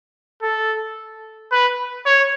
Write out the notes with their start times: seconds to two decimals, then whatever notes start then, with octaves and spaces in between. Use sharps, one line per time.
0.42 A4
1.52 B4
2.06 C#5